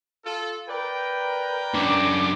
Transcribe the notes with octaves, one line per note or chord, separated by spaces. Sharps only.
F4 A4
A#4 B4 D5 G5
F#2 D4 D6